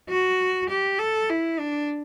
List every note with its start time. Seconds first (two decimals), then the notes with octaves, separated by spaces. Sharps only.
0.09 F#4
0.70 G4
0.99 A4
1.30 E4
1.59 D4